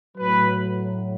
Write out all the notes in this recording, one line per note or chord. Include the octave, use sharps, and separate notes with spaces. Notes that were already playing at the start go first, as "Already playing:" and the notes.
A2 F#3 B4